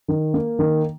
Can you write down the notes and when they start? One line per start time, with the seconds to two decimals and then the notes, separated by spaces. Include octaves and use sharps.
0.08 D#3
0.34 A#3
0.59 D#3